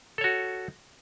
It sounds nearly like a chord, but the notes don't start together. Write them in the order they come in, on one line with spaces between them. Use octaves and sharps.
A4 C#5 F#4